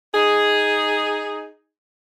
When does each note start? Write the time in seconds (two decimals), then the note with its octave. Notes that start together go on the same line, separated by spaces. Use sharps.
0.14 D#4 G#4